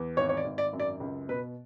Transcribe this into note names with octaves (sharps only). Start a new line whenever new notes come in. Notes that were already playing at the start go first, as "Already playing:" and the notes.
Already playing: E2
G#1 C#5
C#5
D5
G#1
D5
F#2
D5
C#2
B2 B4